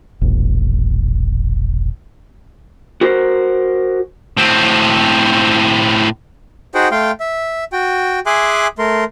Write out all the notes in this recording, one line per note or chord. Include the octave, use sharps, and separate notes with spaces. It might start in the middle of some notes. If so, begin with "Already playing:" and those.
E1 A#1
F#4 A#4 C5
A2 C4
D#4 F#4 G#4 C5 F#5 G5
A3 F5 G5 C6
E5
F#4 G5
G#4 E5 G#5 C6 D6 F#6
A3 A#4 C6